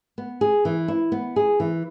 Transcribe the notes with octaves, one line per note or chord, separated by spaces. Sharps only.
B3
G#4
E3
E4
B3
G#4
E3